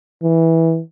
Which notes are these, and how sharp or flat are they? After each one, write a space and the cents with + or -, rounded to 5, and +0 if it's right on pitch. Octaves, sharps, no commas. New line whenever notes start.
E3 -10